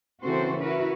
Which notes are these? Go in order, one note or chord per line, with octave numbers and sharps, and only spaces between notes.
C#3 E3 C4 F#4 A4 C5
E4 F#4 A#4 B4